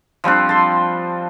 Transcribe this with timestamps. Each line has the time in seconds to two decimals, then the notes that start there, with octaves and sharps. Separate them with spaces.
0.24 F3 G3 C4 D4
0.49 A5 C6